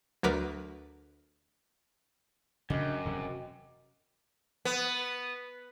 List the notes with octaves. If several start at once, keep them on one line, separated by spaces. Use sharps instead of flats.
D2 F#3 A#4 B4 D6 B6
F#2 C#3 D4 D#5 G5 D6
E1 C3 F#3
B3